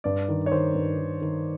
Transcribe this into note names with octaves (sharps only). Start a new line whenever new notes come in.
G2 D5
D#3
C#5
D#3 C5
G2
D#3
D#3